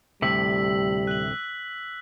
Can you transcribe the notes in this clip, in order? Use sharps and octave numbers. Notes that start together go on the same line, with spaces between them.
D2 A2 C3 G3 E6 B6 F#7
F#6 F#7